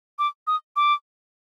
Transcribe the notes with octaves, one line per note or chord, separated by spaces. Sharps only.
D6
D#6
D6